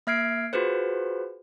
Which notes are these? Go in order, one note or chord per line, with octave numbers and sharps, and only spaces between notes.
A#3 E5 F6 G#6 C7 D7
F4 F#4 G#4 B4 C5